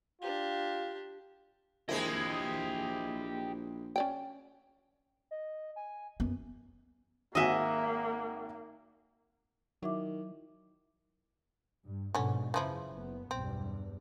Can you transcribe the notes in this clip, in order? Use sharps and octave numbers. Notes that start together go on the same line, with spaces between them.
D4 F4 G4
A#1 G#3 C4 E4 G4 A#4 D#5
C#4 D5 G5
D#5
G#5
F#2 B3
G#1 A#3 F#4 D#5 E5 G#5
D#3 F#3 E4 E5 D6
G2
G#2 B2 D3 F3 C#4
F#2 C#3 E3 F3 E4
F#1 B3
B1 E2 G2 C4